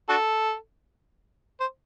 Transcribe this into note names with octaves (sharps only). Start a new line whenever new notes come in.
D4 F#4 A4
C5